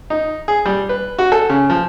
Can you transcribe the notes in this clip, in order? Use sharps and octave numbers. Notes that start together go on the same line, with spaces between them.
D#4
G#4
G3
B4
F#4
A4
C#3
F3